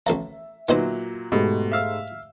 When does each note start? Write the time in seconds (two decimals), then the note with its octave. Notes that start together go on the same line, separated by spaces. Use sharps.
0.06 A1 A3 E5 A#5
0.69 A#2 F#3 B3 D#4 C5
1.32 G#2 B2 A3 G4
1.72 E5 F5 E6